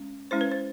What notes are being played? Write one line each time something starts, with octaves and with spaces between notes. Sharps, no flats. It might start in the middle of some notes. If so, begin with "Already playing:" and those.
Already playing: G#3 C#4
G#3 C#4 E4 C5
B4
C5